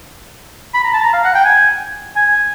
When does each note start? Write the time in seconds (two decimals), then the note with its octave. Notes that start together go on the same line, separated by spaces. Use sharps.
0.74 B5
0.84 A#5
0.93 A5
1.02 A#5
1.13 F5
1.24 F#5
1.35 G5
1.45 G#5
2.16 G#5